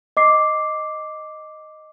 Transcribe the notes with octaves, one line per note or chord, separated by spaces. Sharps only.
D#5 D6 C7